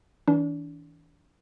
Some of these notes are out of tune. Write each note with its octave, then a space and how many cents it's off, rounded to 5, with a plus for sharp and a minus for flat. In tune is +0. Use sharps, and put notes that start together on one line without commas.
E3 -40 D4 -35